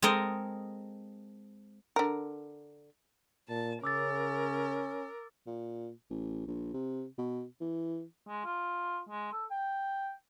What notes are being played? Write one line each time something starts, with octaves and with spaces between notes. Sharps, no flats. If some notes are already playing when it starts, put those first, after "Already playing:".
G#3 C4 A4 A#4 D#5
D3 A#4
A#2 A5
C#3 C#4 A#4 D6 E6 A6
A#2
A1
A#1
C3
B2
E3
G#3
F4
G#3
A4
G5